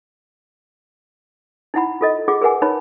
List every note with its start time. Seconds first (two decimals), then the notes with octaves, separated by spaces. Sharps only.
1.74 D#4 E4 F#5 B5
2.01 F4 A4 D#5
2.28 F4 G#4 F#5 D6
2.41 G#4 A#4 B4 F#5 G#5
2.62 D#4 B4 C#5 A5 B5